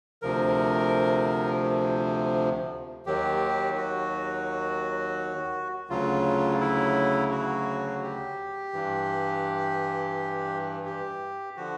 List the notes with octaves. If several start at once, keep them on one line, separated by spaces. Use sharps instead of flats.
D2 C3 F3 A#4
D#2 D#3 F#3 G4
F#4
D2 C#3 F#3 F4
E4
F#4
G4
G2 E3
G4
D3 F3 F#4